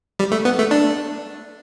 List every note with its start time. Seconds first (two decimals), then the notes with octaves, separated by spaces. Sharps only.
0.19 G3
0.32 A3
0.45 B3
0.59 A3
0.71 D4